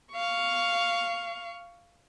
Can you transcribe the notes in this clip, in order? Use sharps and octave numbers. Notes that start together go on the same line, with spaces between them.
F5 C#6